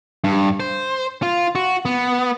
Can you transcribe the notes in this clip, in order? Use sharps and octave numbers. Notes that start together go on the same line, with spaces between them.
G2
C5
F4
F#4
B3